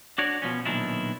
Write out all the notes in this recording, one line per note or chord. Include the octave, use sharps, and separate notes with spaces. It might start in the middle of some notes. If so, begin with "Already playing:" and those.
D4 F#4 C#5 D5
B2 F3 C#4
B1 A#2 D#3 D4 E4